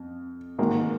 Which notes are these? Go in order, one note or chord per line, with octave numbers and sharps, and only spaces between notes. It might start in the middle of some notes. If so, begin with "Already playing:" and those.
Already playing: F2
G#1 G#2 D#3 A#3